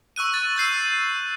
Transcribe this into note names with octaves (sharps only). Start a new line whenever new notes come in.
C#6 E6 F#6 D#7
A6
E6 G6 C7 D#7